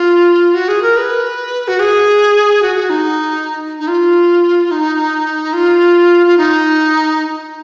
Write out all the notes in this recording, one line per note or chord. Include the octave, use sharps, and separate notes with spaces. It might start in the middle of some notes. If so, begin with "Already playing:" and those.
Already playing: F4
F#4
G#4
A#4
B4
F#4
G#4
F#4
F#4
D#4
D#4
F4
D#4
F4
F4
D#4